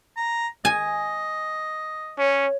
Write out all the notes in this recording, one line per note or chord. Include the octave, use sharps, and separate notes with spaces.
A#5
D#5 G#5
C#4 C#5